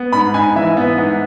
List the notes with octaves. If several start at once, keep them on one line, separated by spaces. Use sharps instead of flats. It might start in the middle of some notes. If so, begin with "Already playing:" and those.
Already playing: B3
G#2 B5
G#2 G#5
E3 E5
B3
G#2